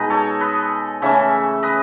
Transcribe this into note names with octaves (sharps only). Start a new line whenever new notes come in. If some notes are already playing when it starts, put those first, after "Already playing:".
Already playing: B2 G#3 D#4 B4 D#5
A4 C#5
B4 D#5
C#3 E3 A3 C#4 C#5 E5
B4 D#5